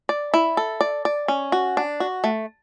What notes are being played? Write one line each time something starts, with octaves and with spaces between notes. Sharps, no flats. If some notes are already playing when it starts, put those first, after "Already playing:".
D5
E4
A4
D5
D5
C#4
F#4
D4
F#4
A3